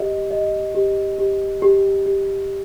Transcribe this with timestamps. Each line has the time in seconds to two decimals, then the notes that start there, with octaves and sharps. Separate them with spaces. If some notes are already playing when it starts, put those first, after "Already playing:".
Already playing: G4 D#5
0.31 D#5
0.75 G4
1.19 G4
1.62 G4
2.06 G4